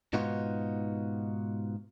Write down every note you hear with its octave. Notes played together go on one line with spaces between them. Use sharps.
G#2 B2 B3 D#4 F4 F#4